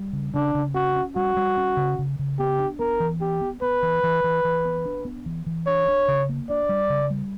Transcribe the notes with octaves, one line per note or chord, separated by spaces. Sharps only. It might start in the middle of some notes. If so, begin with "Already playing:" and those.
Already playing: G3
C#3
C#3 D4
C#3
C#4 F#4
C#4
G3 F#4
G3
C#4
C#3
C#3
C#3
B3 G4
D4
B3 A#4
E3
B3 G4
B3
B3 B4
E3
E3
E3
E3
B3
D4
B3
E3
E3
D4 C#5
D4
C#3
A#3
D4 D5
G3
C#3
G3